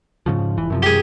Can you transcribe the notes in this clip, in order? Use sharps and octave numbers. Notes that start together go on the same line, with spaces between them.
G#2 C#3 F3
F1 E3
F#2 C3 F3
G4 G#4